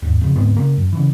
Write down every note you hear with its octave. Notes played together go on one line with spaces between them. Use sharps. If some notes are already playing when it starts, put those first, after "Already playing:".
D#2 G#2
F2 C#3
D2 G#2 B3 C4
C#3 A#3
F#2
C#3 E3